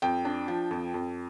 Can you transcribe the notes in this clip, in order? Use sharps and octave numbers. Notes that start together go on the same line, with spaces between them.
F2 G5
D4
F3
F2
F2